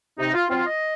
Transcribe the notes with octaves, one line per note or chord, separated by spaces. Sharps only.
C3 D#4
F4
F#3 C4 F4
D#5